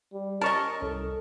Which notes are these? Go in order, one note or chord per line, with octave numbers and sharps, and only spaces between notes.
G3
C#4 A#4 D#5 A5 C#6
C2 A4